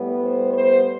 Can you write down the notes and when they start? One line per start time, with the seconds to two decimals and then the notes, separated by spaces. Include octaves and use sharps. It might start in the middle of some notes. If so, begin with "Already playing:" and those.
Already playing: A2 G3 B3
0.24 C5
0.54 C5